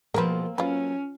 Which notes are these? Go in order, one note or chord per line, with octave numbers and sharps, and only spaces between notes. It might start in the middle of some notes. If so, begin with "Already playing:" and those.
B2 F3 G#3 A#3 C4 A#4 B4
F#3 C#4 F4 B4